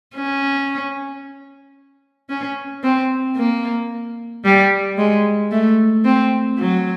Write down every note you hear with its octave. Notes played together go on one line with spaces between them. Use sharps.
C#4
C#4
C4
A#3
G3
G#3
A3
C4
F#3